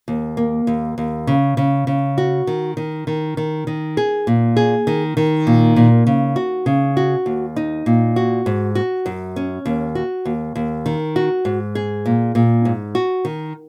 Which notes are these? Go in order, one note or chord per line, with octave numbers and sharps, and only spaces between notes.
D#2
A#3
D#2
D#2
C#3
C#3
C#3
F#4
D#3
D#3
D#3
D#3
D#3
G#4
A#2
G#4
D#3
D#3
A#2
A#2
C#3
F#4
C#3
F#4
D#2
D#4
A#2
F#4
G#2
F#4
F#2
C#4
D#2
F#4
D#2
D#2
D#3
F#4
G#2
G#4
A#2
A#2
G#2
F#4
D#3